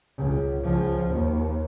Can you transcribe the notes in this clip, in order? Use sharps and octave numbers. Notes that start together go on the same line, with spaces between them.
C#2
C#2 F3
D#2